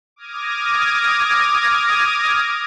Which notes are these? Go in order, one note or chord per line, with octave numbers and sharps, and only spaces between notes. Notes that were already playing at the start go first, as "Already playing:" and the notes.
D6 D#6 F6 G#6 A#6 D#7